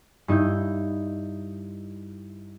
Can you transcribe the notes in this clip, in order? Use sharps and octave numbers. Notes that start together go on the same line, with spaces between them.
G2 D#4 E4 G6